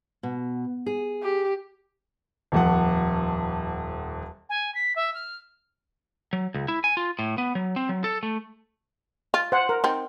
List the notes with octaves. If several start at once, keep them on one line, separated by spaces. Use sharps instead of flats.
B2
G#4
G4
D#1 F2 F#5
G#5
B6
E5
F6
F#3
C#2
E4
G#5
F4
A2
B3
F#3
C4
F#3
A4
A3
F4
C5 F#5
A#4
C4 D#4